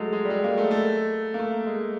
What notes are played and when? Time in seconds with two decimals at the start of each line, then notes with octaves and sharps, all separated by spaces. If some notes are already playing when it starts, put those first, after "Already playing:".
Already playing: F#3 G#3 A3
0.13 G#3
0.25 G3
0.30 G#3
0.44 A#3
0.58 A3
0.71 A3
1.34 A#3
1.39 A3
1.66 G#3